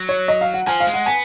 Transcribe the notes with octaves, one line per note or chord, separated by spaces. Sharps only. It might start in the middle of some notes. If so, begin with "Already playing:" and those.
Already playing: F#3
C#5
D#5
F5
F#5
F3 G#5
F5
G#3
F#5
B3 G#5